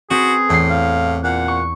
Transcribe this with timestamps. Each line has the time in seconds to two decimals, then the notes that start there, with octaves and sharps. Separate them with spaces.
0.10 C4 F#4 G#4 B4
0.49 E2 A2 C7
0.70 F5
1.24 A#2 F#5
1.48 C#6